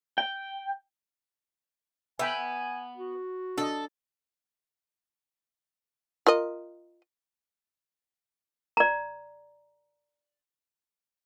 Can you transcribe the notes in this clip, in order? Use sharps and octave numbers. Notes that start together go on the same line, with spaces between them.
G5
B3 E5 G5 G#5 B5
F#4
D4 A4 D#5
F4 A#4 D#5
D5 A#5